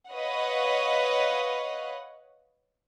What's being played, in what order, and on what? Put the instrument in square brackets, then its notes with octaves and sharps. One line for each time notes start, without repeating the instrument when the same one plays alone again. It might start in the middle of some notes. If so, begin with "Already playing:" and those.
[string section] B4 C#5 D#5 F5 F#5